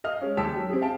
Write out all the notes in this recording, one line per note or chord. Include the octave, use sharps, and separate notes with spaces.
D#5 F5 F6
G#3 C#4
D#2 G5 A5 E6 B6
F#3
C4 G4 G#4
F5 G5 A5